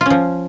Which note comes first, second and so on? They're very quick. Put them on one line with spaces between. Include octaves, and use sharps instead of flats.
F4 C#4 F3